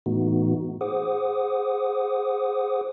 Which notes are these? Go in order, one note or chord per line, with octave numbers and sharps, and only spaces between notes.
A2 E3 A3 B3 D#4 F#4
G#4 C5 F#5 D6 D#6